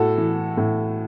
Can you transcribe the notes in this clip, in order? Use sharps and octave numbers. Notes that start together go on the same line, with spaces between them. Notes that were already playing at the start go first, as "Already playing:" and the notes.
Already playing: A2 F#4 A4
E3
A2